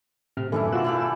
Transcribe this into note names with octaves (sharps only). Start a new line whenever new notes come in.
A2 C3 F6
F#2 D#3 E3 A3 D4 E4
B2 F4 F#4 E6 F#6
E4 G4 A4